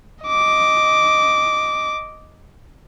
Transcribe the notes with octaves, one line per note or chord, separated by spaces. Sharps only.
D#5 D6